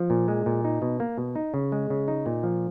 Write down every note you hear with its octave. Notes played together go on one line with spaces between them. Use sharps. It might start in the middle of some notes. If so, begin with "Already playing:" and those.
Already playing: F3
A#2
G#3
A#2
D#4
B2
A#3
B2
D#4
C#3
G#3
C#3
D#4
A#2
F3